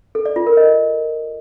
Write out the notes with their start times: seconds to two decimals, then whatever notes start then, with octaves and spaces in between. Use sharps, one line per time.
0.15 A4
0.26 D5
0.36 F4
0.47 A#4
0.57 D#5